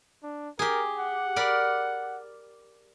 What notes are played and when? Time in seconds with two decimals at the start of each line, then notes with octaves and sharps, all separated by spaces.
0.23 D4
0.59 G4 G#4 A#4
0.99 F#5
1.36 A#4 D5 B5